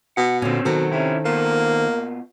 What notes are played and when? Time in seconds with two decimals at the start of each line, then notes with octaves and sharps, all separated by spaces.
0.17 B2 F#5
0.42 A#2 D3 C4 C#4
0.65 B2 D#3 F#3 C4 A4
0.92 C3 C#4 E4
1.25 B2 A#3 F4